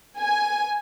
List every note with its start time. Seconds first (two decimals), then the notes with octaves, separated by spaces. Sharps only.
0.19 G#5